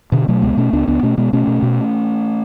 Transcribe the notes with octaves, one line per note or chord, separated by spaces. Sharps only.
B2 D3
B2 F#3 A3
C#2 G#3 B3
B2 A3 C#4
C#2 B3 D4
C#2 B3 D4
B2 A3 C#4
B2 G#3 B3
B2 A3 C#4
B2
B2